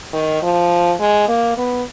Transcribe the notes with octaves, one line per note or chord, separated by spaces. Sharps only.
D#3
F3
G#3
A#3
B3